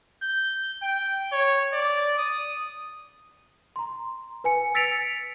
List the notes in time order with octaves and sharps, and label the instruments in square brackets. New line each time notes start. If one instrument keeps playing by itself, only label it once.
[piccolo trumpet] G6
G5
C#5
D5
D#6
[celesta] A#5 C6
B4 G#5 C#7
E6 A6 B6 C#7 D7 F7